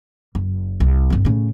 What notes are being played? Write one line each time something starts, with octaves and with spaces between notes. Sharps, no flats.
F#1
C2
G1 C4
A2 C#3